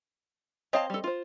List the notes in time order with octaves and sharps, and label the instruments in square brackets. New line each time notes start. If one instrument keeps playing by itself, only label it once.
[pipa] C4 D#5 [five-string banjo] C#5 F5 A5
[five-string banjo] G3 A4
F4 C5